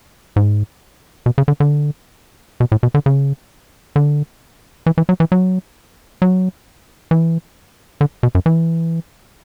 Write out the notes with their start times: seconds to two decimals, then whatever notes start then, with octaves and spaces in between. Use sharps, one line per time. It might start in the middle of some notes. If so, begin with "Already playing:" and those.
0.36 G#2
1.26 B2
1.38 C#3
1.48 D3
1.60 D3
2.60 B2
2.72 A2
2.83 B2
2.94 D3
3.06 C#3
3.96 D3
4.86 E3
4.98 E3
5.09 F#3
5.20 E3
5.32 F#3
6.22 F#3
7.11 E3
8.01 D3
8.23 B2
8.35 F#2
8.46 E3